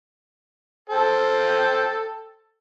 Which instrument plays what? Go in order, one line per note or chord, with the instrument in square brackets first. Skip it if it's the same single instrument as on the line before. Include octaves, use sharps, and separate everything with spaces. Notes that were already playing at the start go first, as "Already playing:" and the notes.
[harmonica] A4 C5 G5